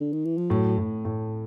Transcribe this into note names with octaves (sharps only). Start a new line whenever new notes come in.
D3
D#3
E3
F3
A2 F#3
A2
A2